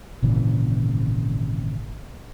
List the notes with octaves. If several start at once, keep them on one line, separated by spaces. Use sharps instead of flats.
G#1 A#2 C#3 E3